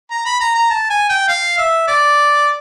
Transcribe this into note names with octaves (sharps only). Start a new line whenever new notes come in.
A#5
B5
A#5
A#5
A5
G#5
G5
F5
E5
D5